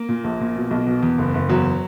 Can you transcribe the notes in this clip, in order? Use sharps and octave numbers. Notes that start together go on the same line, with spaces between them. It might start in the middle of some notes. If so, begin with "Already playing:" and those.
Already playing: A#3
A#2
A#1
A#2
B2
B1
B2
E2
F#1
F#1
E2 F#3